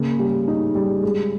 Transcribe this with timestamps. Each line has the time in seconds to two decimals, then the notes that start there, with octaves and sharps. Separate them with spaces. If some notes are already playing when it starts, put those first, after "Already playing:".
Already playing: C#3 A#3
0.19 G3
0.47 D#4
0.75 G3
1.03 G#3